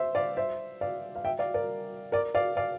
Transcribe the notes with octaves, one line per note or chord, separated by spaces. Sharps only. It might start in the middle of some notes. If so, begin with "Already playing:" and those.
Already playing: C5 E5
D5 F5
C5 E5
D5 F5
F5
E5 G5
D5 F5
A#4 D5
A#4 D5
D5 F5
D5 F5